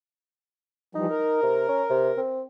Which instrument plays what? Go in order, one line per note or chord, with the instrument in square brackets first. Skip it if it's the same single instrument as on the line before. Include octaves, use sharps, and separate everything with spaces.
[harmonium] E3 F3 G3 [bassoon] D#4
[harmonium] A#4
[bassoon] C3
C#4
C3
C4